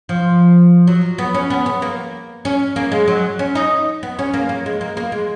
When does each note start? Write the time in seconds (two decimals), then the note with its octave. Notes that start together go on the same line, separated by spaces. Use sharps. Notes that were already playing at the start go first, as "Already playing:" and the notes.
0.09 F3
0.87 F#3
1.18 B3
1.34 C#4
1.50 B3
1.66 B3
1.82 A#3
2.45 C#4
2.76 A#3
2.92 G#3
3.07 F#3
3.39 C#4
3.55 D#4
4.03 B3
4.19 C#4
4.34 A#3
4.49 A#3
4.66 G#3
4.81 A#3
4.97 A#3
5.12 G#3